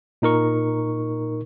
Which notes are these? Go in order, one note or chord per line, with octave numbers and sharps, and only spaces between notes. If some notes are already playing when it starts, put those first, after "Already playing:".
A#2 D#4 A#4 C#6